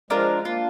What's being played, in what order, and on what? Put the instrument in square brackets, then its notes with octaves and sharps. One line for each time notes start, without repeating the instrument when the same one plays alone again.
[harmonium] F3 G#3 [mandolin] D4 F4 A#4
[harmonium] A#3 D4 [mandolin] F4